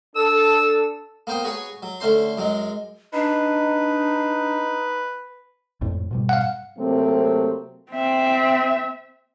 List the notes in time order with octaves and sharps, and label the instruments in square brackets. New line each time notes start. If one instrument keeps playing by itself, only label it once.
[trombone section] D4 A4 [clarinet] E6
[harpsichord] A#3 B3 C5 G5 D#6
F#4 G#4 B4 C#5 F#5 G#5
F#3
D3 A3 C#4 C5 C6
F#2 F#3 G#3
[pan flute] D4 [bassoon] D#4 [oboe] B4
[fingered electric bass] G#1 F2 A2
G#2 B2 G3
[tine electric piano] F5 F#5
[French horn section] C3 F#3 A3 A#3 C4
[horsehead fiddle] C4 E5